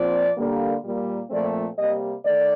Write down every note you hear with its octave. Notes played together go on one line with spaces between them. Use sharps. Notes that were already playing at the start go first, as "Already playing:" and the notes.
Already playing: A#2 F3 C4 D5
D3 G3 A#3
A#2 G3 A#3
A#2 F3 A3 C4 D5
C3 G3 A#3 D#5
D#3 A3 D5